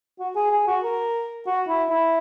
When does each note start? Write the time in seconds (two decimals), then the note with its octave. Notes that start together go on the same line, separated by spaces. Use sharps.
0.19 F#4
0.36 G#4
0.51 G#4
0.67 F#4
0.84 A#4
1.47 F#4
1.68 E4
1.90 E4